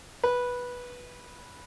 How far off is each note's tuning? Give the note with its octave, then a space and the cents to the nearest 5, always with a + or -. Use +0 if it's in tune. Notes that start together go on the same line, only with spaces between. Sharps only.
B4 -10